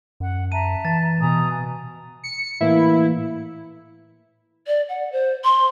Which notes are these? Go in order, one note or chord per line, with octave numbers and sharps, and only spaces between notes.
F#2 F#5
E5 A5 A#5 D#7
E3 A6
B2 G#5 A#5 D#6
C#7
A2 E3 A#3 E4
D5
F#5
C5
C6